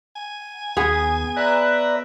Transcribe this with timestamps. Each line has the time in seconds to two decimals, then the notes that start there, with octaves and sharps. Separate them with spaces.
0.16 G#5
0.77 D#2 B3 G#4
1.37 B4 D5 E5 A#5